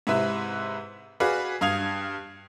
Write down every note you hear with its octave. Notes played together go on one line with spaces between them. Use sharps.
G#2 C3 E4 B4 E5
F#4 G#4 B4 D5 F5
G2 F5 D#6 G#6 F7